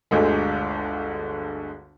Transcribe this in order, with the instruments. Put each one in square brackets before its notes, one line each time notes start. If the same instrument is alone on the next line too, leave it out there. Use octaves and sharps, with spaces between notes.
[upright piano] G1 D2 D3 G#3